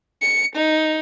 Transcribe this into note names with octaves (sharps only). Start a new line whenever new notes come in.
C#7
D#4